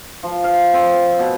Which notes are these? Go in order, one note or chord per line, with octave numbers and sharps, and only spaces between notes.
F3
F5
C4
B2